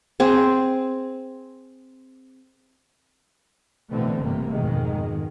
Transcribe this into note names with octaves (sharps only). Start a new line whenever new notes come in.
C4 G#4
B2 D3 E3 A3 C4
G1 C3 A3 A#3
F2 G#2 B2 D#3 G#3